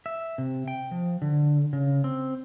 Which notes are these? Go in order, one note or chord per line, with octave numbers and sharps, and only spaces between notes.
E5
C3
G5
F3
D3
C#3
C4